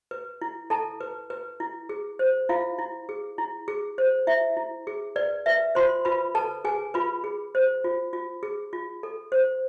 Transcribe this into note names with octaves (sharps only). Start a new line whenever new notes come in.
B4
E4
E4 A4 A5
B4
B4
E4
G#4
C5
E4 F4 F5
E4
G#4
E4
G#4
C5
E4 E5
E4
G#4
B4 D5
B4 E5
F4 C5 C6
F4 B4 B5
A4 B4 A5
G#4 B4 G#5
F4 B4 B5
G#4
C5
F4
F4
G#4
F4
A4
C5